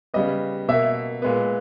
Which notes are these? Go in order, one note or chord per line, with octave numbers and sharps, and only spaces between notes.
C#3 G3 B3 D#5
B2 A#3 E5
A#2 G#3 B3